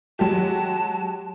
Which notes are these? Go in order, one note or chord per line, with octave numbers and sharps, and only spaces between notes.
F#3 G#3 G4 A5